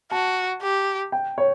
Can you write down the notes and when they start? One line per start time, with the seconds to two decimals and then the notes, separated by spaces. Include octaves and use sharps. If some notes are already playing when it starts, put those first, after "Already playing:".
0.11 F#4 A5
0.62 G4
1.12 G5
1.38 C#5